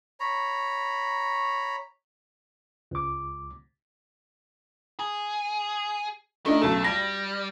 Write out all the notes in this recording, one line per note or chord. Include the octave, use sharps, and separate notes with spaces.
C#5 A#5 B5
C#2 D6
G#4
D#3 A3 D4 D#4
B1 C#3 A3 A4
G3 A#6